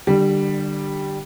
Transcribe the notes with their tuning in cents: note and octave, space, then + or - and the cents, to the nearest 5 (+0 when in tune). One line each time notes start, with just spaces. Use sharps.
D3 +30 G3 +0